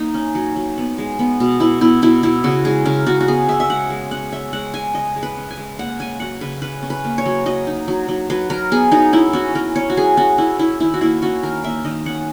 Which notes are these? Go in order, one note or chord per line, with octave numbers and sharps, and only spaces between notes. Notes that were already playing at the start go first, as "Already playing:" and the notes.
Already playing: A#3 D#4
C#4
F#3
F#3
B3
G#3
B3
B2
B3 E4
B2 E4
B2 E4
B2 E4
C#3 F#4
G#3 G#4
C#3 A#4
C#3 F#4
F#4
B3 G#4
C#3 E5
E5
G#3 F#5
G#3
C#4 F#5
C#4 E5
G#3 F#5
G#3 G#5
C#3 D#5
G#3
B4
C#4
G#5
G#3
A#3 F#5
C#4 G#5
F#3 F#5
C#3 B4
C#4 B4
C#4
B4
A#3
C#5
F#3
F#3 D#5
D#4
F#3
F#3
F#3 B4
F#3 A#4
B3 G#4
F#3 D#4
C#4 E4
C#4 F#4
C#4 A#4
C#4 C#5
F#4
F#3 G#4
C#4 F#4
C#4 E4
C#4 E4
D#3 E4
F#4
A#3 E4
C#4 F#4
D#3 A#4
A#3 E5
D#3 D#5
C#4 F#5